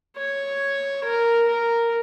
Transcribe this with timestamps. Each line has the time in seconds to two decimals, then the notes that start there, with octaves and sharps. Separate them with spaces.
0.18 C#5
1.04 A#4
1.47 A#4